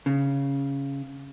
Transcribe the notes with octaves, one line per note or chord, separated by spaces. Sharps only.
C#3